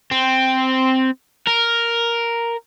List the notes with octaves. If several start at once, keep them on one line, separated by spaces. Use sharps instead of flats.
C4
A#4